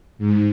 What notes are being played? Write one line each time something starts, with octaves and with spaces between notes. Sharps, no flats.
G#2